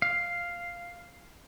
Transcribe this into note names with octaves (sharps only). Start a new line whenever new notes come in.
F5